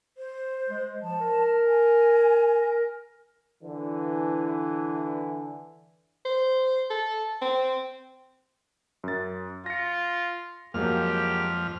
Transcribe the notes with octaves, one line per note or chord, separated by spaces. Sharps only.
C5
G#3
F3 A5
A#4
G#5
A#4
D3 E3
C5
A4
C4
F#2 A6
F4 A#6 C#7
F2 F#3 G#3 A#3 G4 F6